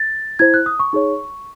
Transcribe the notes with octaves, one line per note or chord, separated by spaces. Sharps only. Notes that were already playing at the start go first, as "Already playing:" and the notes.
Already playing: A6
E4 C5 G#6
F#6
D#6
C#6
D#4 G#4 C#5